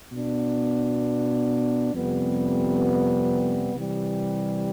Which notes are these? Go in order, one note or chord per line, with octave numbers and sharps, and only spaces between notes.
B2 B3 D4
F2 C3 G3 B3
C3 E3 G3